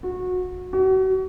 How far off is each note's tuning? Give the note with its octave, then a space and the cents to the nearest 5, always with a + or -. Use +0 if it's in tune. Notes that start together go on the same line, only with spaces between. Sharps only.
F#4 -25
F#4 +35